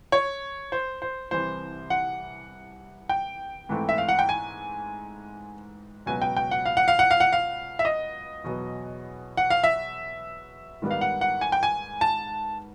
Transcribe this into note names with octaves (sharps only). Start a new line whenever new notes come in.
C#5
C5
C5
C2 C3 E3 C5
F#5
G5
G#2 E3 A3 C4
E5
F5
F#5
G5
G#5
C#2 B2 F#3 B3 G#5
G5
G5
F#5
F5
F#5
F5
F#5
F5
F#5
F5
E5
D#5
E2 B2 F#3 B3
F#5
F5
E5
G#2 D#3 G3 B3
F5
F#5
F#5
G#5
G5
G#5
A5